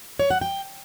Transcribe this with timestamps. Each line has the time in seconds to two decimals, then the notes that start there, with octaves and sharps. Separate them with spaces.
0.19 C#5
0.30 F#5
0.41 G5